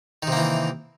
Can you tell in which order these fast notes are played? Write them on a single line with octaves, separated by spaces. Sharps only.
D#3 C3 A#3 E3